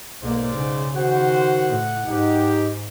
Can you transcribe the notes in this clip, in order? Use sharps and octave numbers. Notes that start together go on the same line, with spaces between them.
B1 G#2 A#3 C5 D5
C#3
D#3 F#4 C5 F#5
A2
G#2 D#4 G4